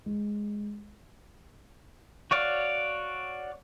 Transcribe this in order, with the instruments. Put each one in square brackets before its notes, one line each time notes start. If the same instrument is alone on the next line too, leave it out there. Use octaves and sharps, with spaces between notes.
[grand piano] G#3
[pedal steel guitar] F#4 C#5 D5 F5